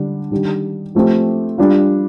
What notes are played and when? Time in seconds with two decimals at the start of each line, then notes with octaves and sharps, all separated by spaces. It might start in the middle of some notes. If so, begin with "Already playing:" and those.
Already playing: D3 G3 D4
0.31 D#3 G3 D4 G4
0.95 F3 A3 C4 G4
1.58 G3 D4 F4